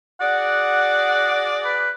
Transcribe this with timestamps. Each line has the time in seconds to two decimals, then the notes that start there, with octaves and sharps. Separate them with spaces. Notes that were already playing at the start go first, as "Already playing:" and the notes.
0.20 F#4 G#4 D5 F#5
1.65 B4